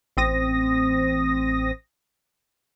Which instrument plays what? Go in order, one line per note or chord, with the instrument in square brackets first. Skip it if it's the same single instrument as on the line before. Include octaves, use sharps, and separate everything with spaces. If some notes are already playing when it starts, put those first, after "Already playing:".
[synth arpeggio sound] A1 C4 D#6 A#6